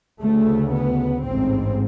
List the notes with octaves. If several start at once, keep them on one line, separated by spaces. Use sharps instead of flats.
D2 C#3 A3
B3
A1 G#2 C4